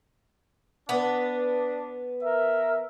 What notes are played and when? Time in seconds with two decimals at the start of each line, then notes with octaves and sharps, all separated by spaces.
0.89 B3 D4
2.23 A#4 E5